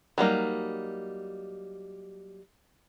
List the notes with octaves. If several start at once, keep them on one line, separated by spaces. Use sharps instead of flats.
F#3 G3 A#3 D#4